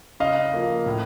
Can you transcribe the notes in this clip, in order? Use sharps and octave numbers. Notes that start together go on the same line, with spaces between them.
C#3 D#5 F5
F3 A#3
A2